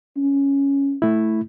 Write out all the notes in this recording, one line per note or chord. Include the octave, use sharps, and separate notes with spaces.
C#4
A3 E4